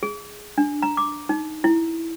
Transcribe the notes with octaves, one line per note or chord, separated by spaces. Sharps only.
G#4
D4
A#5
D6
D#4
E4